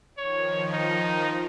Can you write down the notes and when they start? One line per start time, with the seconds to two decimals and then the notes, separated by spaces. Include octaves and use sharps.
0.18 D#3 F3 C#5
0.73 D#4